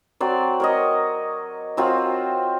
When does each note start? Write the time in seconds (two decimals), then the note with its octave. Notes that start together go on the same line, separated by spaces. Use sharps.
0.20 F#3 C4 D5
0.60 A#4 C#5 D#5
1.77 F#3 C4 F4